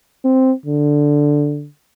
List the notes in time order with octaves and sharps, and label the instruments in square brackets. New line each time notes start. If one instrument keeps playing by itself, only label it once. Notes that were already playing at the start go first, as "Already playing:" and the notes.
[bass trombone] C4
D3